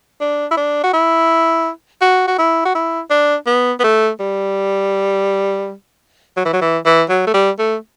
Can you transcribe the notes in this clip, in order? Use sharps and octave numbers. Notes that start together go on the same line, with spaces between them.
D4
E4
D4
F#4
E4
F#4
F#4
E4
F#4
E4
D4
B3
B3
A3
G3
F#3
E3
F#3
E3
E3
F#3
A3
G3
A3